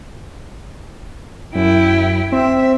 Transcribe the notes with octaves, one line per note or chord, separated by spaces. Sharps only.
F#2 E4 G5
C4 E5